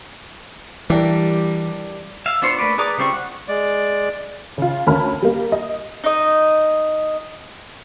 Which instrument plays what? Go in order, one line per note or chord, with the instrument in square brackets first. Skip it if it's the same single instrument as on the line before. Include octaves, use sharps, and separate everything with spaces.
[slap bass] E3 [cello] G3 [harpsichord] D4 G4 A#4
[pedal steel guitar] E5 F5
B3 D4 F4 C5 C#5
A3 A#3 B4 D5
G#4 B4 D5 A#5 D6
C#3 G3 C4 F4 C#6
F#5
[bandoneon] G#3 D5
[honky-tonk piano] C#3 F4
D2 C#4 A#4 A5 B5 F6
G3 A#3
D#5
[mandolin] D#4 D#5